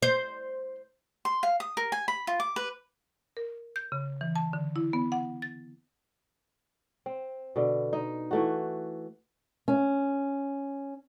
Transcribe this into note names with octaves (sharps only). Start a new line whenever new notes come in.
C5
C6
F5
D#6
A#4
G#5
B5
F4
D6
B4
A#4
G6
C#3
E3
A5
D3
E4
B3
F#5
A6
C4
B2 D3
D#4
E3 A3 F#4
C#4